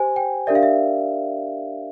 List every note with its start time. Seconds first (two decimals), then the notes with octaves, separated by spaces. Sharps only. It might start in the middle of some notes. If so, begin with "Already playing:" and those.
Already playing: G4 C5 G#5
0.16 G5
0.47 D4 G4 A#4 D5 E5
0.55 F5
0.63 E5